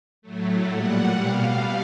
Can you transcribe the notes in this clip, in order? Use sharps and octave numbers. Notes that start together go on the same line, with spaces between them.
A2 F#3 A3
A#2 G3 F#5
B2 G3 F5